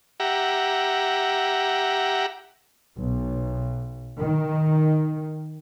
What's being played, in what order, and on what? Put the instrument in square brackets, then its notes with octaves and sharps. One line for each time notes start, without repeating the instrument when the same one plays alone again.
[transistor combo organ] G4 E5 F#5 A#5
[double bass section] B1
D#3